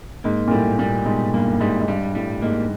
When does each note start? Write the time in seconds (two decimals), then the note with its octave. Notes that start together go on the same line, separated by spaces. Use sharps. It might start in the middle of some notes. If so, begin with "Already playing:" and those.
0.24 G#2 A#3
0.47 A#2
0.51 A2 G3
0.79 A#2 G3
1.06 G#2 B2
1.34 G2 A#3
1.60 G#2 G3
1.81 G#2
1.88 G2 G3
2.15 A2 G3
2.42 G#2 A#3